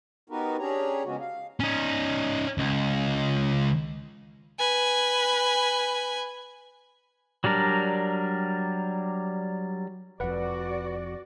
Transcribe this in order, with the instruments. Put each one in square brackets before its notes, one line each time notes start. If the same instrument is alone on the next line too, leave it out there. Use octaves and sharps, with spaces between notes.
[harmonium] B3 D#4 F#4 G4 A#4 B4
C#4 D4 G4 G#4 C#5 A#5
C#3 F3 G#3 B3 C#4 F#4
F5
[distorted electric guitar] C#4 D#4
C#2
[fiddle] B4 G#5
[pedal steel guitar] F#3 G3 D4 A#4
[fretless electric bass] F1 F2 [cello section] F#4 D5 [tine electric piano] B4 F#5